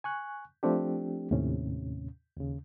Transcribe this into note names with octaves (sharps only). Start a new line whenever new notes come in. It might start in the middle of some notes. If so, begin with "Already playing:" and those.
G#5 C#6 F#6
F3 A3 C4 D4 G4
D#2 A2 C3 C#4
D#2 C#3